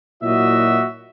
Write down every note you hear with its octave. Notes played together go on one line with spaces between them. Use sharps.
A#2 F#3 E4 F#4 D#5 E5